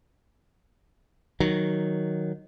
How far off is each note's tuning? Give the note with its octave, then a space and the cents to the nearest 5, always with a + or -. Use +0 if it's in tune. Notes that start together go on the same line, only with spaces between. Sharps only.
D#3 +0 F#3 +0